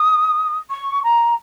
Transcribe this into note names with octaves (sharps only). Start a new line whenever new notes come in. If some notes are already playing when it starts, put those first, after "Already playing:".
Already playing: D#6
C#6
A#5